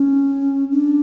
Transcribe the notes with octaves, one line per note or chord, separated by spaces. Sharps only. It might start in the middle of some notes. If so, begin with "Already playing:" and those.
Already playing: C#4
D4